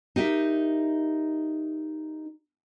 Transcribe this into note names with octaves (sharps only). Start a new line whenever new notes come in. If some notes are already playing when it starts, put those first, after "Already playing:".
D#4 G4 A#4 E5